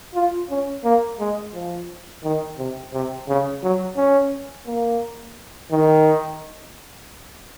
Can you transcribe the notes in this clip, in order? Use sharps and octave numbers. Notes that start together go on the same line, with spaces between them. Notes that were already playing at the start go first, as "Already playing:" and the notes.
F4
C#4
A#3
G#3
F3
D#3
C3
C3
C#3
F#3
C#4
A#3
D#3